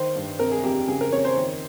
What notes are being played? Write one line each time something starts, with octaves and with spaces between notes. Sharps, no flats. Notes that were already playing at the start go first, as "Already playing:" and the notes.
Already playing: D#3 C5
G2
C3 A#4
G#4
F2 G4
C#3 G#4
A#4
F2 C#5
C5
D#3